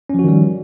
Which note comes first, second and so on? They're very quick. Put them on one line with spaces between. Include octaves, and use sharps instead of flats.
C#4 F3 F#4 D#3 G3